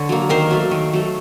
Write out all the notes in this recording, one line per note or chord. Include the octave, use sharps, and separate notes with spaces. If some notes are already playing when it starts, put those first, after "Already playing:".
Already playing: D3 C#5
F#3 A#3
D#3 A#4 C5
F#3 A3
D#3
F#3 A3